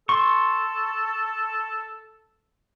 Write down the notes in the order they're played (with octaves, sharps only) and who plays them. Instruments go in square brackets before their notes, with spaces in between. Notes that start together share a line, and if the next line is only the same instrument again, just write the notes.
[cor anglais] A4 [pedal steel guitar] C6 C#6